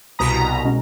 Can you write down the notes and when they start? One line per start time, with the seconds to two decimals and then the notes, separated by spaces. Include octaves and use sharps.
0.19 C2 B2 A#5 D#6 B6
0.64 B2 G#3 C#4